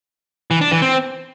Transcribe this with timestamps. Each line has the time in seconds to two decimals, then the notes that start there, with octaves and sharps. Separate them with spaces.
0.51 E3
0.61 D4
0.71 E3
0.82 C4